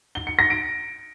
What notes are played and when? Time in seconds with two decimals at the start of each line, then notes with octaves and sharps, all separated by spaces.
0.15 G7
0.27 C#7
0.39 A#6
0.50 D7